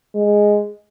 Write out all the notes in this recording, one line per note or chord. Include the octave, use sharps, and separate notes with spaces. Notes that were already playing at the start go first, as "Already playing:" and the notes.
G#3